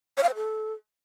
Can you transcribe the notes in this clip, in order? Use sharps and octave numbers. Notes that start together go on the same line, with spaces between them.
C#5
F5
C5
A4